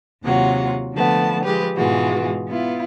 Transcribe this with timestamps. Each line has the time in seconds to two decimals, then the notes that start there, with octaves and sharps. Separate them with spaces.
0.25 D#2 C3 F#3 F4 F#5
0.94 D3 F3 A3 B3 A5
1.43 F3 G#3 G4 B4
1.76 G#2 B2 E3 G#3 F4 F#4
2.48 B3 E4 F4